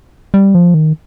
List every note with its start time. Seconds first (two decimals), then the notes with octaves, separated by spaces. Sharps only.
0.34 G3
0.55 F3
0.74 D#3